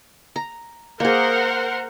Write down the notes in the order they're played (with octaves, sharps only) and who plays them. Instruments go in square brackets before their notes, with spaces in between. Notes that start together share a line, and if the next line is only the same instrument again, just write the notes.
[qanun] A#5
[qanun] A#3 G#4 [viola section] A#4 C5 F#5